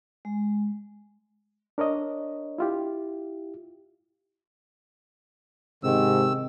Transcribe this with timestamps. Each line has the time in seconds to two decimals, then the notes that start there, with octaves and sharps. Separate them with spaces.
0.25 G#3
1.78 D4 A#4 C#5 D#5
2.58 E4 F4 G4
5.84 G#2 C3 D#3 E6